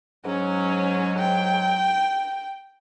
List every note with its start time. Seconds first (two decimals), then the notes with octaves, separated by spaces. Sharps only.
0.25 G#2 F#3 C#4
1.19 G5